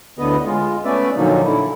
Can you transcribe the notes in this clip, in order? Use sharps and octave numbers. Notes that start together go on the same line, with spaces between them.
D2 A2 D3 B3 B4 D#5
G#3 F4
A3 B3 C#4 B4 D5 E5
A#2 D3 F3 F#3 A#3 D#4
D3 E4